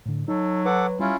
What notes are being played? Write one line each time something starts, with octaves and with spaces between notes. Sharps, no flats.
A2 D3
F#3 D#4 A4
A4 B4 F#5 D6
G3 C#4 E4 F4